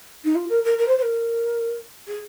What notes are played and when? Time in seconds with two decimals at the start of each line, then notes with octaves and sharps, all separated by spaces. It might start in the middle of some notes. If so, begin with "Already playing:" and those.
0.25 D#4
0.35 F4
0.49 A#4
0.65 A#4
0.78 A#4
0.88 C5
0.98 C5
1.02 A#4
2.08 G#4